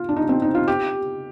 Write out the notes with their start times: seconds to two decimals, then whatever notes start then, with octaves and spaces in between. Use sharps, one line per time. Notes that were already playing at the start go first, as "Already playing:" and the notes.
Already playing: F4
0.09 D4
0.16 D#4
0.29 C4
0.42 D#4
0.55 F4
0.68 G4